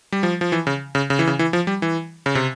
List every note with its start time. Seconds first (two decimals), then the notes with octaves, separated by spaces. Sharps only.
0.12 G3
0.23 F3
0.41 F3
0.52 E3
0.67 C#3
0.95 C#3
1.10 C#3
1.19 E3
1.27 C#3
1.39 E3
1.53 F3
1.67 G3
1.82 E3
2.26 C#3
2.35 C3